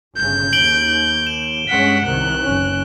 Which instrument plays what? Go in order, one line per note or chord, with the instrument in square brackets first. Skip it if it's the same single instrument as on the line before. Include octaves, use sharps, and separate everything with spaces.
[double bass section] G1 C#3 [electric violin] G6
[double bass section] D#2 [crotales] D7 F#7 G7
[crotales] E7
[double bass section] G2 G#3 C#4 [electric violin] F#5 B6
[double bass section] C2 C3 D#3 [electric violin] F#6
[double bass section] F#1 C#4